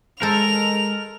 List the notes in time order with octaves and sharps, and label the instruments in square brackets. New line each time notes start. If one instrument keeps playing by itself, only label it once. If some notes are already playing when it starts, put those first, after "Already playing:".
[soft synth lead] G#3 [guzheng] A4 C5 [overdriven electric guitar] A#4 [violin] F7